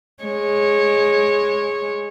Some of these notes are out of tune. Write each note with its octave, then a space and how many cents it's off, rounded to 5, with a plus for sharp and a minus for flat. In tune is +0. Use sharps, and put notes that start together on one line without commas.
G#3 +0 C#5 -15